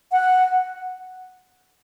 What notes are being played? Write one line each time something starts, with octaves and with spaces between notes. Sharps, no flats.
F#5